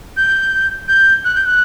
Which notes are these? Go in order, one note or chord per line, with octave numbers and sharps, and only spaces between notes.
G6
G6
F#6
G6
F#6